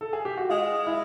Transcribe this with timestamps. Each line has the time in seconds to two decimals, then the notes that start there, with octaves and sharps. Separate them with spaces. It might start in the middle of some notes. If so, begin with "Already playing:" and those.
0.01 A4
0.13 G#4
0.25 G4
0.37 F#4
0.49 G#3 F4
0.86 E4